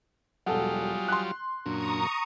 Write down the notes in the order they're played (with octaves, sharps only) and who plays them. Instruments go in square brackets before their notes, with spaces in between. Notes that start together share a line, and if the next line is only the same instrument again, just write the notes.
[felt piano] E1 A4 F#5 [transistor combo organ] F#3 G3 F4 [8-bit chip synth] G#5 D#6
[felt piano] C6 F#6
[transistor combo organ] F#2 A#2 [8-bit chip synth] D4 [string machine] A#5 C#6 D#6